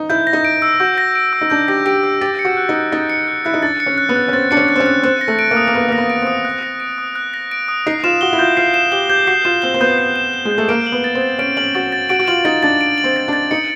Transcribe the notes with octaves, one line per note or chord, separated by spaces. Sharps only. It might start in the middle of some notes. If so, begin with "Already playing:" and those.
Already playing: D#4
E4 G6
A#6
D#4
D7
E6
F#4 G6
A#6
D7
E6
D#4
D4 G6
G4 A#6
G4 D7
E6
G4 A6
C#7
F#4
F#6
D#4
F#6
D#4 A6
C#7
F#6
E4 F#6
D#4
D4 A6
C#7
C#4
F#6
B3
F#6
C#4
C4 A6
D4 C#7
C#4
F#6
C4
C#4
F#6
C4 F#6
A#6
A3
D7
A#3
D#6
A#3
B3 F#6
A#3 A#6
B3
D7
C4 D#6
F#6
A#6
D7
D#6
F#6
A#6
D7
D#6
D#4 C7
F4 E7
F#4 G7
E4
F4 G6
F4 C7
E7
G4 G7
G4 G6
F#4 C7
F4 E7
C4 G7
C4
B3 G6
C7
E7
G7
G#3
G6
A3
A#3 D7
F#7
B3
A6
C4
A6
C#4 D7
C#4 F#7
F#4 A6
A6
F#4 D7
F#4
F4 F#7
D#4 A6
D4 A6
D7
F#7
C4
A6
D4
A6
D#4 C#7